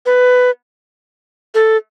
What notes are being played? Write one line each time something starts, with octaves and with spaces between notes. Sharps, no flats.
B4
A4